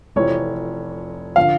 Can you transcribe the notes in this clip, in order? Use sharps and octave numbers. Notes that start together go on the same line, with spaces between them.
F1 F2 E3 C#5
D3 F3 F5